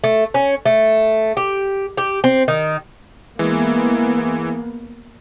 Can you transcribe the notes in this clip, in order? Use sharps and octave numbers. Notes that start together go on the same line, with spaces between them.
A3
C#4
A3
G4
G4
C4
D#3
E3 G#3 A#3 B3